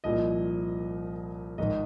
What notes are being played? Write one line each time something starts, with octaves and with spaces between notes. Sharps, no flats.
C2 A#2 F3 D#5
G#1 G#2 D#3 D#5